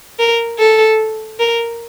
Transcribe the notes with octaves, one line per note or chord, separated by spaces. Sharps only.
A#4
A4
A#4